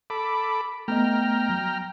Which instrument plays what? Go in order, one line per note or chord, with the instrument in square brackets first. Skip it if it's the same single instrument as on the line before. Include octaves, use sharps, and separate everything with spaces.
[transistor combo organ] A4 B5 D6
[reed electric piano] A3 B3 D#5 [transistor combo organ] G5 A#5 F6
[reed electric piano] F#3